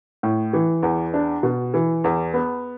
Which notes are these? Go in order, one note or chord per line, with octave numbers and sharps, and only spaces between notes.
A2
E3
E2
D4
B2
E3
E2
B3